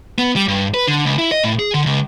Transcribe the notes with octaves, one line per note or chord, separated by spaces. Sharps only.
B3
G3
G2
B4
D3
C#2
E4
D#5
A2
G#4
D3
C#2